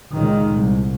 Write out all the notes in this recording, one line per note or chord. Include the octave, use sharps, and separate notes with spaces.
C#2 A#2 D#3 G#3
C2